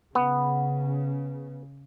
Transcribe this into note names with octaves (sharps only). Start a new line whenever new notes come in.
C#3 B3